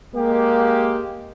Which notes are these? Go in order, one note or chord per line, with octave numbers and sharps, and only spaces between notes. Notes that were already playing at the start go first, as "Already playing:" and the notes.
G#3 A#3 G4